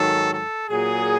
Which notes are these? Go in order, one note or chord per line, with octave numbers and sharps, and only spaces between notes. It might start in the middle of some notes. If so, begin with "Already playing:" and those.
Already playing: G#2 D#3 F#3 A4
A4
A#2 F#3 G#4